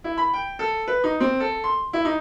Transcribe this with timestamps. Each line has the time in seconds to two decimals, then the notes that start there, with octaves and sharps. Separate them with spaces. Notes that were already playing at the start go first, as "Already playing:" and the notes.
0.04 E4
0.17 B5
0.33 G5
0.59 A4
0.88 B4
1.04 D#4
1.20 C4
1.40 A4
1.64 C6
1.93 E4
2.05 D#4